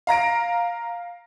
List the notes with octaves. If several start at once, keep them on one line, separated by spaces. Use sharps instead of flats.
F5 A#5 A#6 D7